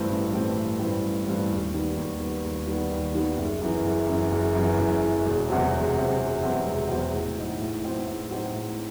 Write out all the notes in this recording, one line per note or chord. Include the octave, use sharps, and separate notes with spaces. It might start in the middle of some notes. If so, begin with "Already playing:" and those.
Already playing: G2 E3 A3 C4
A1
G2 E3 A3 C4
A1
G2 E3 A3 C4
A1
G2 E3 A3 C4
D#2
D#3 G3 B3
D#2
D#3 G3 B3
D#2
D#3 G3 B3
D#2
D#3 G3 B3
F#1
F#2 E3
F#1
F#2 E3
F#1
F#2 E3
F#1
F#2 E3
E1
E2 C3 F#3 C4
E1
E2 C3 F#3 C4
E1
E2 C3 F#3 C4
E1
E2 C3 F#3 C4
A2
F#3 C4 D#4
A2
F#3 C4 D#4
A2
F#3 C4 D#4
A2